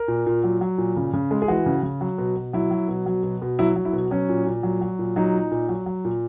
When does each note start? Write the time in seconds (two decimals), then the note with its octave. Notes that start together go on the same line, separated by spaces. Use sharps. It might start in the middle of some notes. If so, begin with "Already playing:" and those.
Already playing: A#4
0.08 A#2
0.26 A#2
0.44 F#3
0.61 F#3
0.78 A#2
0.96 C#3
1.13 C#3
1.31 G#3
1.42 G#4
1.48 E3 F#4
1.66 C#3
1.83 C#3
2.01 F#3
2.18 B2
2.36 B2
2.53 F#3 E4
2.71 F#3
2.88 B2
3.06 F#3
3.23 B2
3.42 B2
3.59 F#3 E4
3.76 F#3
3.85 E4
3.93 B2
4.11 F#3 C#4
4.29 A#2
4.46 A#2
4.63 F#3
4.81 F#3
4.99 A#2
5.16 F#3 D#4
5.34 A#2
5.51 A#2
5.69 F#3
5.86 F#3
6.05 A#2